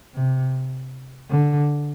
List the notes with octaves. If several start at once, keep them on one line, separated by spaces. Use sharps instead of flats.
C3
D3